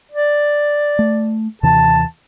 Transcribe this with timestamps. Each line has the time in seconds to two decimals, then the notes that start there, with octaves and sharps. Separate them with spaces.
0.12 D5
0.99 A3
1.63 D#2 C3 E3 A5